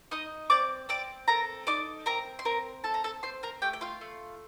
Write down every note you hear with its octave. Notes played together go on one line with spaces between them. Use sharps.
D#4 D#5 D#6
C4 D5 D6
C4 D5 D6
A4 A#4 A#5
D#4 D5 D6
C4 A#4 A#5
C6
C4 A#4 A#5
A4 A5
A#5
A4 A5
C4 C5 C6
A#4 A#5
A3 G4 G5
G5
F4 F5
A3